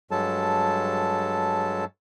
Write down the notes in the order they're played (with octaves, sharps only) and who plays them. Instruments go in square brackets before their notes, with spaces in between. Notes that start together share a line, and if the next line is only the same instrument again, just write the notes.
[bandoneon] G2 F#3 G#3 A4 A5